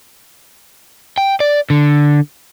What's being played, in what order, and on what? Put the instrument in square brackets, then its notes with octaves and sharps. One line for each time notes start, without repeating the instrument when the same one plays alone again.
[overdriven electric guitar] G5
D5
D3